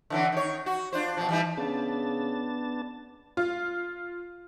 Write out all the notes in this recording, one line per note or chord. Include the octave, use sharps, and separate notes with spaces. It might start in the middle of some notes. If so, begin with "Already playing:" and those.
D3 E3 C#4
D#3 C#5
F#4
D4 F4 C5
B2 F3
E3 G3 D#4
C#3 B3 D4 A5
F4